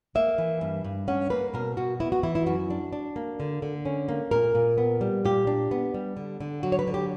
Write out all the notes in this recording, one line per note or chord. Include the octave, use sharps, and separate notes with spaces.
A#3 E5
E3
G2
G2
C#4 F#5
A#3 B4
B2 A#4
B2 F#4
B3 E4
F#4
E3 E4
E4
F#2 F#4
D4
D4
A#3
D3
D3
C#4
A#3
A#2 A#4
A#2
B3
G3
A#2 G4
D4
B3
G3
D3
D3
F#3 F#4
C#5
B4
D3
G4